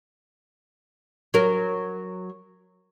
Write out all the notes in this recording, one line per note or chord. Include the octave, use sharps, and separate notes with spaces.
F#3 A#4